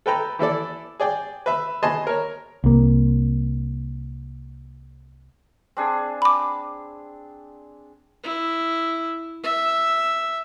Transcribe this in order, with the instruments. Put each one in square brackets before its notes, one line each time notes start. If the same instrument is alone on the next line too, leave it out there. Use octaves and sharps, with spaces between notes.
[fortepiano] A4 B4 G5 A#5
E3 E4 A4 D5
G#4 D5 G5
B4 E5
B4 D#5 G#5 A5 C6
A#4 C#5
[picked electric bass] C2 A#3
[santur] C4 D4 G#4
[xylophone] B5 D6
[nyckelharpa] E4
E5